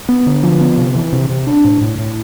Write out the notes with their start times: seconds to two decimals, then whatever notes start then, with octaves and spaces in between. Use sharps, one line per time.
0.09 B3
0.27 D3
0.43 F3
0.61 B3
0.78 C3
0.95 E3
1.13 C3
1.29 C3
1.47 D4
1.64 A2
1.81 A2
1.98 A2